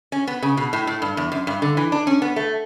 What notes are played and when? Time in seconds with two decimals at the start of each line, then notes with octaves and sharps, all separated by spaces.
0.12 C#4
0.27 B3
0.42 C#3
0.57 B2
0.73 A2
0.87 A2
1.02 G2
1.17 E2
1.32 F#2
1.47 G2
1.62 D3
1.77 E3
1.92 D4
2.07 C#4
2.22 B3
2.36 A3